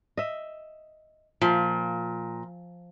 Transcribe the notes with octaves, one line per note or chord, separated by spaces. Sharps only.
D#5 E5
A#2 F3